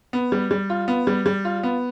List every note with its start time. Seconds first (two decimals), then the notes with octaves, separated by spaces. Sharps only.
0.13 B3
0.32 G3
0.51 G3
0.70 F4
0.88 B3
1.07 G3
1.26 G3
1.45 F4
1.63 B3